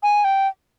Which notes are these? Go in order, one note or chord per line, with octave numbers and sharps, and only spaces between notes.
G#5
G5